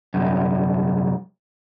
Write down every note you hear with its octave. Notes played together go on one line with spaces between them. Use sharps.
C2 F#2